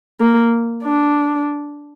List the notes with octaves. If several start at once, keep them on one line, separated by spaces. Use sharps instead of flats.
A#3
D4